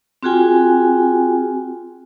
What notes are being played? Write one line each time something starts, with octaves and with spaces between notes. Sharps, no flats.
C4 F4 F#4 G#4 G5 G#5